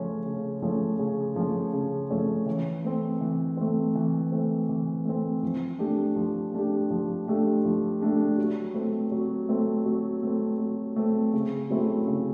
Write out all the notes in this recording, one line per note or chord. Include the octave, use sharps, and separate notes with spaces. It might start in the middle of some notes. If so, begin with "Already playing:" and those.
Already playing: C#3 F3 A3 C#4
C#3
F3 A3 C#4
C#3
F3 A3 C#4
C#3
F3 A3 C#4
E3
A3 C4
E3
A3 C4
E3
A3 C4
E3
A3 C4
F3
A3 D4 G4
F3
A3 D4 G4
F3
A3 D4 G4
F3
A3 D4 G4
F#3
A3 C4
F#3
A3 C4
F#3
A3 C4
F#3
A3 C4
C#3
F#3 A3 C4 E4
C#3